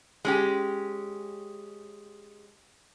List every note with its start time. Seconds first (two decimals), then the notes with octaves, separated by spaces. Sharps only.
0.25 G#3 C#4 G4